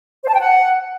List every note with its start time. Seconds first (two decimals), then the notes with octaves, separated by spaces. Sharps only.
0.23 C5
0.29 A5
0.34 G5
0.40 F#5